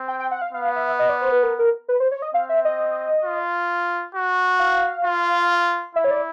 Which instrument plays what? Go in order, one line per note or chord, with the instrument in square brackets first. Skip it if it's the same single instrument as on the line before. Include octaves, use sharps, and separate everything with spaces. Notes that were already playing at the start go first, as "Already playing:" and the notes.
Already playing: [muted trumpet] C4
[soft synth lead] G5
G5
F#5
F5
[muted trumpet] B3 [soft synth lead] F5
[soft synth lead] E5
D#5
D5
C5
B4
A#4
A#4
B4
C5
C#5
D#5
[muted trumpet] C4 [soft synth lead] F5
[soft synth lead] E5
D#5
[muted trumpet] F4
F#4
[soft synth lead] F5
[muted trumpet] F4
[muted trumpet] E4 [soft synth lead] E5
[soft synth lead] C#5
D5